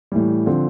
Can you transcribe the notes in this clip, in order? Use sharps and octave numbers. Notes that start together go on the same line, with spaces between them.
A2 E3 G3
D3 F3 C4